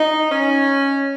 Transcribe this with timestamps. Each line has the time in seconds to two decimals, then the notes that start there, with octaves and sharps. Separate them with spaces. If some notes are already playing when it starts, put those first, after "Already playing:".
Already playing: D#4
0.31 C#4